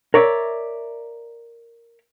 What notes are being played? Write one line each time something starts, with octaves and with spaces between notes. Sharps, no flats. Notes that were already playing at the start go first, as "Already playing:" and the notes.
A#4 C#5 D5 E5